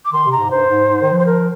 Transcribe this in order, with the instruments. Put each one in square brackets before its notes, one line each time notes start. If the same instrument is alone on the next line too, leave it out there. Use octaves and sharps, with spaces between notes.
[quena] D6
[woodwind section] D#3 [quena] C6
[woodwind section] C3
[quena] A#5
[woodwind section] G#2
[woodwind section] G2 [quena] C5
[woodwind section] G#2
G#2
D#3
F3
[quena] C5
A#4